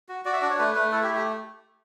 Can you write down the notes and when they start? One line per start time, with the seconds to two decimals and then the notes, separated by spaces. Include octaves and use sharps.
0.09 F#4
0.25 F#4 D5
0.33 E5
0.42 D4 D5
0.50 C#5
0.59 A3 B4
0.75 A3 B4
0.92 E4 A4
1.03 G4
1.09 A3
1.15 G4